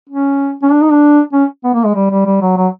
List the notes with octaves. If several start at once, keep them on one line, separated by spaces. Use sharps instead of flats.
C#4
C#4
D4
D#4
D4
C#4
B3
A#3
G#3
G3
G3
G3
F#3
F#3